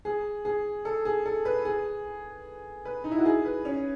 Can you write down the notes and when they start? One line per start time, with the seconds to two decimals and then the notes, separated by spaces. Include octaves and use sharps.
0.05 G#4
0.45 G#4
0.85 A4
1.05 G#4
1.25 A4
1.45 B4
1.65 G#4
2.85 B4
3.04 D#4
3.11 E4
3.18 F#4
3.25 G#4
3.45 B4
3.65 C#4